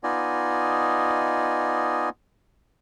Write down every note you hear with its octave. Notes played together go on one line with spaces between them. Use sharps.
B3 D#4 F4 D5 D#5 G#5